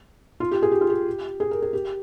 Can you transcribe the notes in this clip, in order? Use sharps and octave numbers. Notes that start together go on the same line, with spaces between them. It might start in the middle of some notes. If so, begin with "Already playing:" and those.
F4
G4
G#4
G4
F4
G4
G#4
A#4
G#4
G4